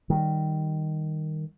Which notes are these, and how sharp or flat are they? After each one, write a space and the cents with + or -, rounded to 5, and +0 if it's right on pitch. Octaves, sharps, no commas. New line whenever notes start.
D#3 +0 G3 +0